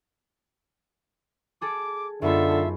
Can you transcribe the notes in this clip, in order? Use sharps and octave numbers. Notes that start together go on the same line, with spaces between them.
G#4 A4 D6
F#2 D3 B3 D#4 F4 A4 E5